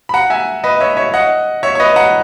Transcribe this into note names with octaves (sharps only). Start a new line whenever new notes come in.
B5
F#5 A#5
E5 G#5
B4 D#5
C#5 E5
C#5 E5
D#5 F#5
C#5 E5
C#5
B4 D#5
F#5 A#5